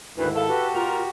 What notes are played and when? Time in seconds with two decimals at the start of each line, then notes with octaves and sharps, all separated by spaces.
0.17 D2 G#2 D#3 E4 B4
0.36 A4 F5
0.48 F#4 G4 B4
0.75 A#2 F4 A#4